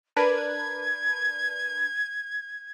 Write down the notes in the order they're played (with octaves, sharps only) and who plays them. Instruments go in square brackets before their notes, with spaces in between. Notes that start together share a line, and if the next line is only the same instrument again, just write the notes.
[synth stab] D4 A#4 B4 [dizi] G#6